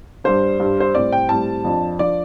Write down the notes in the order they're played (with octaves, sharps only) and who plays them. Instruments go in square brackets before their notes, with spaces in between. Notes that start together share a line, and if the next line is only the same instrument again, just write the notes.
[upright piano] G2 G3 D4 C5
G2 G3 D4
C5
A2 G3 C4 D5
G5
A2 G3 C4 A5
F2 F3 D4
F3 D4 D5